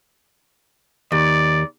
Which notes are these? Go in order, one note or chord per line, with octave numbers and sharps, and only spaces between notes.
D#2 D5